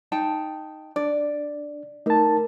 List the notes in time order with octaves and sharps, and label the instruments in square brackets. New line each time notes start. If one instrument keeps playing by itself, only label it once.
[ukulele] D#4 G5 A5
[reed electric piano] D4 [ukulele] D5
[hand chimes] A3 A#4 [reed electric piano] D#4 A5